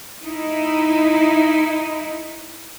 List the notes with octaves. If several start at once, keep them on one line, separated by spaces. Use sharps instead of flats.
D#4 E4